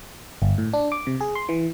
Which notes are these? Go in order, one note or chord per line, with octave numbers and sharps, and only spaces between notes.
G1
A2
D4
D6
C3
G#4
C6
E3